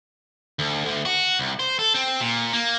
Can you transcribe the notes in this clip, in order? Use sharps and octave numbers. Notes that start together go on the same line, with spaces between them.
D2
D2
F#4
C2
C5
A4
C4
A#2
A#3